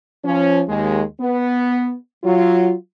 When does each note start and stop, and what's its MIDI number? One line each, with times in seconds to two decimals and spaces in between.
0.24 0.63 53
0.24 0.63 61
0.68 1.02 39
0.68 1.02 56
1.20 1.94 59
2.23 2.73 54
2.23 2.73 65